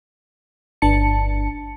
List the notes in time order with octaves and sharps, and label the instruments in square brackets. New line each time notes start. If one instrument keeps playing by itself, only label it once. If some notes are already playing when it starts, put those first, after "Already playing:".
[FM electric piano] G1 D4 A5 C#7